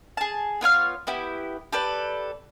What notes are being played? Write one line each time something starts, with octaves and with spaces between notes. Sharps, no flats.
G#4 A5
B3 F4 C#5 F6
B3 E4 G4
G4 A4 B4 D5